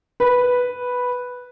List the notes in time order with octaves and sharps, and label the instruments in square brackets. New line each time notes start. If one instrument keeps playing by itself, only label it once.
[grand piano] B4